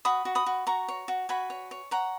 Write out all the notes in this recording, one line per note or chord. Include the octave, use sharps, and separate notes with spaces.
F#4 B5 D#6
F#4
B5 D#6
F#4
F#4 A#5 C#6
C#5
F#4
F#4 G#5 B5
C#5
C#5
C#5 F#5 A#5